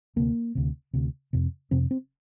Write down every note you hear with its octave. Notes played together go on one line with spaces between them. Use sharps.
D2 C3 A#3
D2 C3
D2 C3
F2 C3
F2 C3 C4
C4